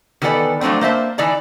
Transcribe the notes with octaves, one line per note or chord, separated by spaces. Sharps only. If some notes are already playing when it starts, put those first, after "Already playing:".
D#3 E3 B3 A4 D5 A5
F3 F#3 A3 C4 D4
A#3 C5 E5 A5
E3 D#4 D5 A5